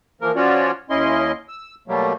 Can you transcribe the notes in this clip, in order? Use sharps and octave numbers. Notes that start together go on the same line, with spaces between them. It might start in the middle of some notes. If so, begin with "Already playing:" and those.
E3 F3 A#3 A#4
F3 C#4 F4 F#4 C#5 D5
D#2 C#4 E4 D#5 C6
E6
B2 F#3 G3 A3 A#3